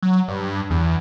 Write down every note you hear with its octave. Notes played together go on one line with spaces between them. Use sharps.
F#3
G2
E2